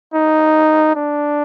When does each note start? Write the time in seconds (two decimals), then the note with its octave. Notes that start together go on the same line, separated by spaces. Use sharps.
0.14 D#4
0.95 D4